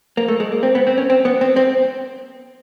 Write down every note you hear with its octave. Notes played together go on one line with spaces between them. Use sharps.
A#3
A3
G#3
A#3
C4
B3
C4
C#4
C4
B3
C4
C4